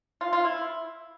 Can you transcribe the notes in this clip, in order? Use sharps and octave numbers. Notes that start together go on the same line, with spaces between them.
F4
F4
E4